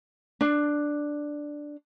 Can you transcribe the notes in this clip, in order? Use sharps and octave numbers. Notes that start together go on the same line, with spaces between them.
D4